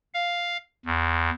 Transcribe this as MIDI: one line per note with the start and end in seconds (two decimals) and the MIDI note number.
0.14 0.57 77
0.86 1.30 40